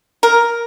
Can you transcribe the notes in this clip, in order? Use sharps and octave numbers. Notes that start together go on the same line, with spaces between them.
A#4